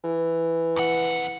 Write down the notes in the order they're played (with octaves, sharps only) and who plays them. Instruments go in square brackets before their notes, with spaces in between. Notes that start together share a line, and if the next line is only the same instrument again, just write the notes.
[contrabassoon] E3
[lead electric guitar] F2 F#5